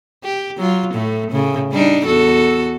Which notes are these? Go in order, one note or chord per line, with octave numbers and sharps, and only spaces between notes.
G4
F#3 F4
A2 A3
A2 C#3
G3 D4 D#4
E2 F#4 A4